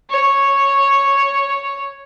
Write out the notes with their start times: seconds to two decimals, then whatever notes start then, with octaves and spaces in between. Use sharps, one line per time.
0.10 C#5